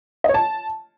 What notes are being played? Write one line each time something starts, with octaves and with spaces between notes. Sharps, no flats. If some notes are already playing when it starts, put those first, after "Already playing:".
D#5
C#5
A5